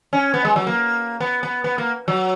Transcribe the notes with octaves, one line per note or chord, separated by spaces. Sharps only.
C#4
B3
G#3
F#3
A#3
B3
B3
B3
A#3
F#3